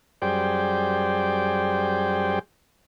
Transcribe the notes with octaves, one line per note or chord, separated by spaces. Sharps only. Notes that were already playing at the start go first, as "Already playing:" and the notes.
F#2 G3 G#4 C5 D5 G5